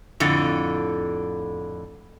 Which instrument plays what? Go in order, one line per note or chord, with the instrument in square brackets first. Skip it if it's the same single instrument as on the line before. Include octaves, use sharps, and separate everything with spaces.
[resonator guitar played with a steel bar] F2 A2 D3